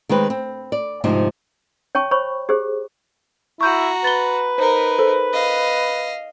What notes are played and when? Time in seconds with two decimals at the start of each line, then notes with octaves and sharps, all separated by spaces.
0.09 D#3 G#3 C4 B4
0.30 C4
0.72 D5
1.04 D2 G#2 C3 F3 D#4
1.95 C#5 G5 A5 C#6
2.11 C5 C#5 B5 C#6
2.49 G4 G#4 C5
3.61 E4 F#4 A#5 C#6 G6
4.04 B4 A6 G7
4.58 D#4 A#4 C5
4.98 A4 C5
5.33 D#5 F5